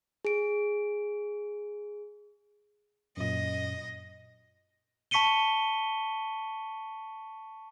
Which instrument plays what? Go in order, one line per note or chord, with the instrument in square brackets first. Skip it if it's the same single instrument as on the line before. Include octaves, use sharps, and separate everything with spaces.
[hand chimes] G#4 D7
[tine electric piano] F#2 A#2 [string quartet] D#5
[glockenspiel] A5 C#6 B6 C#7 D#7 G7